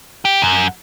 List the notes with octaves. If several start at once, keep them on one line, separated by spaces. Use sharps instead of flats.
G4
F#2